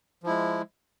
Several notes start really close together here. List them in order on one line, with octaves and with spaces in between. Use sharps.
F3 E4 G#3